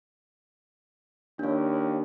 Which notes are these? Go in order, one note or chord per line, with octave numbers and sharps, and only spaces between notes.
D#2 D4 C#5